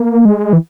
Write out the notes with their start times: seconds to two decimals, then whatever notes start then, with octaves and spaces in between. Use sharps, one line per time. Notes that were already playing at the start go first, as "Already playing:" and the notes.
Already playing: A#3
0.25 G#3
0.53 E3